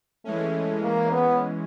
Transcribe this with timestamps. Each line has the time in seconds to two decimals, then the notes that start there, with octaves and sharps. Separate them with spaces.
0.25 E3 G#3 A3 C#4
0.83 A#3
1.12 B3